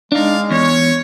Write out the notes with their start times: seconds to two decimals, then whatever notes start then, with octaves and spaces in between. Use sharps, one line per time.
0.12 G#3 D4 D#4 D5 F5
0.51 E2 C#5